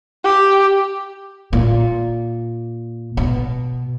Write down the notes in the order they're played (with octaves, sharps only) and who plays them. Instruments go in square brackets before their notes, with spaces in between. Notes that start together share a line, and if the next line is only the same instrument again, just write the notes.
[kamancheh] G4
[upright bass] A#2
B2